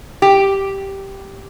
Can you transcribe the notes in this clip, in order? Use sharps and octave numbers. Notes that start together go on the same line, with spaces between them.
G4